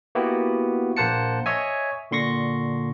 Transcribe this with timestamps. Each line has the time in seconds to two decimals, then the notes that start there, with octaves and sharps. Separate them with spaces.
0.15 A#3 B3 E4 F#4 G4
0.97 A#1 A#3 C5 F#5 A5 C#7
1.46 C#5 D#5 E5 G#5
2.11 A#2 D3 C6 C#6 A#6